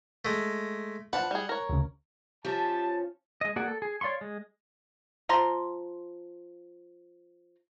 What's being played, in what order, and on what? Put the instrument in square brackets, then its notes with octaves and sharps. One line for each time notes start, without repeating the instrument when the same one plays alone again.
[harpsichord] G#3 A3
[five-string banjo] F3 D4 B4 [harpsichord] F#5
[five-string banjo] G3 G#4
A#4 C#5
[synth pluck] D2 C#3
[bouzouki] F3 C#4 [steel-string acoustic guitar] G4 C5 E5 [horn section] A5
[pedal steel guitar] G#3 D#5
A#3 F#4 G#4 D5 F#5
A4
G#4
C#5 D5 F5 C6 C#6
G#3
[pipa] F3 A#5 C6